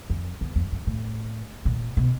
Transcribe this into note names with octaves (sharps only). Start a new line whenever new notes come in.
F2
E2
F2
F#2
A2
A#2
B2